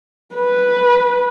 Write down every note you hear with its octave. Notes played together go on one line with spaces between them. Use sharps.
B4